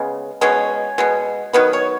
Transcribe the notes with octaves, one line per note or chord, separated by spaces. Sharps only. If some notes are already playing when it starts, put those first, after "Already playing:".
Already playing: C#3 G#3 B3
B2 G#3 B3 C#4
B2 G#3 B3
D#3 F#3 B3 B4
C#5